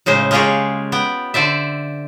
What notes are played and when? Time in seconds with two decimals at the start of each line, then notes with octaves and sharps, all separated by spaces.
0.06 A2 C#3 G#3 C5
0.31 G#3 A#3 F4 G4 G#4 C#5
0.92 B3 G5
1.34 D3 C5 D5 E5